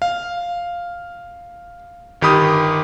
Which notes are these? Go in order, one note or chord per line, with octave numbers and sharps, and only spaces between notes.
F5
G1 D#3 G4 B5 D#6